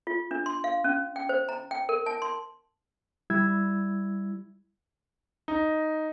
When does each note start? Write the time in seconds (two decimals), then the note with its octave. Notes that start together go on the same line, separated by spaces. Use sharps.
0.07 F4
0.31 D4
0.46 C6
0.64 F5
0.84 C#4
1.16 G5
1.29 C5
1.49 A#5
1.71 G5
1.89 A#4
2.06 A5
2.22 C6
3.30 G3 E4 E6 G#6
5.48 D#4